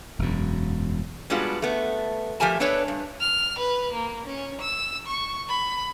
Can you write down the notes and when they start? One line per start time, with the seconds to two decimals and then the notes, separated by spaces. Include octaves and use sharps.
0.19 E1 F#2
1.30 G3 G#3 B3 D4 F4 F#4
1.62 A3 B3
2.40 F3 A3 G4 A#4 G#5 A5
2.60 B3 D4 A4 B4 C#5
2.88 G2
3.20 F6
3.59 B4
3.93 A#3
4.26 C#4
4.61 E6
5.07 C#6
5.48 B5